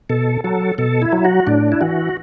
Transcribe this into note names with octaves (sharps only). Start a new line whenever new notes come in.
B2 A4
F#3 A4
B2 A4
E4
F#3
F#4
A2 D4
E4
E3 F#4